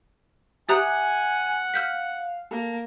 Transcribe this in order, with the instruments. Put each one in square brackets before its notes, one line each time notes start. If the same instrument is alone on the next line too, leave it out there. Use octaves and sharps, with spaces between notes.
[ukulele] G4 B4 E5 [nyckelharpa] F#5 [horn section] G#5 [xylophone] A#5 D#6 A6
[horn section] F5 [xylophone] F6 G6 B6
[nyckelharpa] A#3 [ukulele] A4